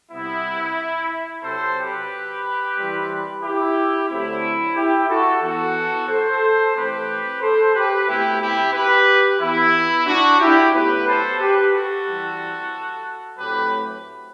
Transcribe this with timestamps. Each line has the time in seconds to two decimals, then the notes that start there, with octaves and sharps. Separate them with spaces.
0.11 C3 G3 B3 E4
1.43 C3 F#3 C4 A4 C5
1.77 G4 B4
2.77 E3 G3 C4
3.43 E4 G4
4.09 D3 F#3 A3 C4 E4
4.75 E4 G4
5.08 F#4 A4
5.42 E3 B3 F#4 A4
6.08 A4 C5
6.75 E3 A3 C4 G4 B4
7.41 A4 C5
7.74 G4 B4
8.07 B2 A3 C4 E4 G4
8.40 E4 G4
8.73 G4 B4
9.40 E3 B3 E4
10.06 D4 F#4
10.40 E4 G4
10.73 A2 F#3 B3 G4 B4
11.06 A4 C5
11.40 G4 B4
11.72 F#4 A4
12.06 E3 G3 C4
13.38 A2 F#3 A3 C4 G4 B4